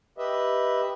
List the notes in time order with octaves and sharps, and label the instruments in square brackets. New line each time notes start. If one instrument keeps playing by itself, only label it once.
[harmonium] G4 B4 D#5 E5